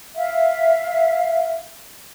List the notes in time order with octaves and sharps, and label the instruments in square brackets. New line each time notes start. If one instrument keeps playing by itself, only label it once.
[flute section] E5 F5